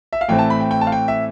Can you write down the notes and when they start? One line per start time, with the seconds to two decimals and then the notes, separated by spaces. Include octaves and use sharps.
0.13 E5
0.21 F5
0.28 A2 E3 A3 C4 G5
0.39 A5
0.50 B5
0.60 G5
0.71 G5
0.81 A5
0.87 F5
0.92 G5
1.08 E5